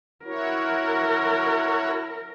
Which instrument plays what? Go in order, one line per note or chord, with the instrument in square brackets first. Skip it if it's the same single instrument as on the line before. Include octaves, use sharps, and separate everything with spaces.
[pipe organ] E4 F#4 C#5 [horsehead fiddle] A#4